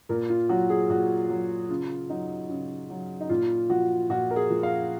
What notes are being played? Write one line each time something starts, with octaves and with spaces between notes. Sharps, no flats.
A#2 A#4
F4
F#3 F#4
G#4
A#2 F#4
F#3
C#3 F4
F#3 D#4
C#3
F#3
D#4
A#2 F4
F3 F#4
A#2 F#4
A#4
G#4
F3
F5